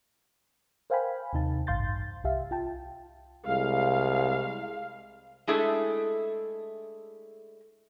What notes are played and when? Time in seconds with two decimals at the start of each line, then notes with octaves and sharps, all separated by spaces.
0.90 A#4 C5 F5 G5 G#5 B5
1.33 D#2 C3 D#4 A5
1.67 A1 G2 F5 C6 G6 A6
2.24 C2 G4 E5 F5
2.51 F4 G5 A5
3.48 C2 G#3 F5
5.47 G#3 A3 D4 E4 G#4 A4